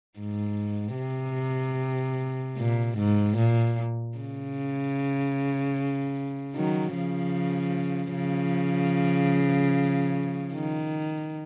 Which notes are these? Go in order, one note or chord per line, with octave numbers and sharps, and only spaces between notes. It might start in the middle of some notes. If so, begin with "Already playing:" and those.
G#2
C3
A#2
G#2
A#2
C#3
D#3 F#3
C#3 F3
C#3 F3
D#3